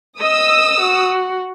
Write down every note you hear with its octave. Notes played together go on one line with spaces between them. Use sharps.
D#5 D#6 E6
F#4